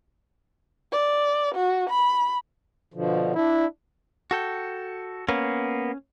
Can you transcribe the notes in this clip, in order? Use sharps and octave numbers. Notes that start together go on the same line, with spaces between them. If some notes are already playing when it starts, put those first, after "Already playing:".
D5
F#4
B5
B2 D3 F3
D4 E4
F#4 A4 G5
A#3 B3 C#4